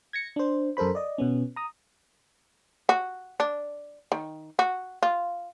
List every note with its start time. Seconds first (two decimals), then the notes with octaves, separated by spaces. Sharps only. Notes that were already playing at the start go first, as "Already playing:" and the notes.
0.13 G#6 A#6 C#7
0.36 D4 C5
0.77 F#2 A4 A#4 C5 B5
0.95 D5 D#5
1.18 B2 B3 C#4
1.56 A#5 D#6
2.89 F#4
3.40 D4
4.12 D#3
4.59 F#4
5.03 F4